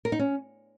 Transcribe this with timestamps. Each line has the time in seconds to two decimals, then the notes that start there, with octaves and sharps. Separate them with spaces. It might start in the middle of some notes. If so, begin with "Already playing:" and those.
0.05 A#4
0.12 D#4
0.19 C#4